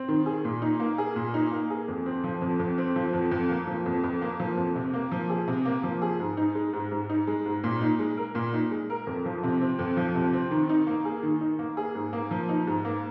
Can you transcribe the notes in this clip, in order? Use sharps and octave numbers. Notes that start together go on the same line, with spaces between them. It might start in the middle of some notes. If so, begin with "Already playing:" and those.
Already playing: C4
D#3
G#4
A#2
D#4
A#3
G#4
A#2
D#4
A#3
G#4
F2
C4
F3
F2
F2
C4
F3
F2
F2
A#3
F3
F2
F2
A#3
F3
F2
C3
A#3
F3
G#4
C3
A#3
F3
G#4
G#2
D#4
G#3
G#2
G#2
D#4
G#3
G#2
A#2
D#4
G#3
A#4
A#2
D#4
G#3
A#4
F2
F3
C3
C4
F2
F3
C3
C4
D#3
D#4
A#3
G#4
D#3
D#4
A#3
G#4
G#2
A#3
F3
D#4
G#2
A#3